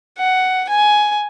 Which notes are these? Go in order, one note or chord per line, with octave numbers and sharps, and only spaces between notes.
F#5
G#5